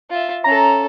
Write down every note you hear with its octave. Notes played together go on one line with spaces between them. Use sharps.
F4 E5
C#4 A4 A#5